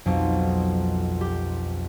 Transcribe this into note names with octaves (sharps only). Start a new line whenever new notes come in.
B1 F2
G4